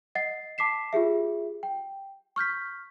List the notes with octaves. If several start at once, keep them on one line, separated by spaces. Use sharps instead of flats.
D#5 F#5 A6 C7
A5 D6 B6 C7 E7
F4 G4 G#4 E5
G5
C#6 F6 G6 B6